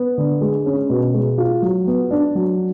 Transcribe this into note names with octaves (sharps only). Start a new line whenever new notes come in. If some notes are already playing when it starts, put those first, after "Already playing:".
Already playing: B3
D3
G#3
C#4
B2
G#3
F4
F#3
B3
D4
F#3